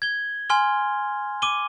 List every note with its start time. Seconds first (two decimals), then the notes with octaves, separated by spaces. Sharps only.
0.02 G#6 G7
0.50 G#5 C6 F6 G7
1.42 D6 D#7 G7